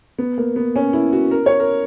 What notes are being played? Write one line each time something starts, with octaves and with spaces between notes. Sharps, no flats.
B3
A#3
B3
C#4
E4
F#4
A#4
C#5
A#4